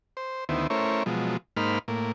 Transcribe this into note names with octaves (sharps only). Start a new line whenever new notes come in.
C5
D2 D#3 B3 E4 C5
A3 C#4 E4 A#4 C5 C#5
B2 F3 F#3 G#3
G#2 A#3 D#4 C5 B5 F6
A2 A#3